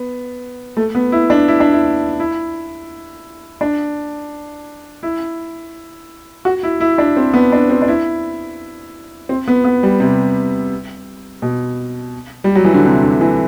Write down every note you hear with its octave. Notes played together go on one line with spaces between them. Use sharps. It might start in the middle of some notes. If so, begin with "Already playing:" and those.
Already playing: B3
A3
B3
E4
D4
E4
D4
E4
E4
D4
E4
F#4
E4
E4
D4
C4
B3
D4
C4
D4
E4
C4
B3
B3
G3
C3
B2
G3
F#3
E3
D3
C3
D3
E3